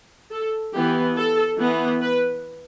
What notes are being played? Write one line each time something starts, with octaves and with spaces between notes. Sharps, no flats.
A4
E3 B3 G4
A4
E3 B3
B4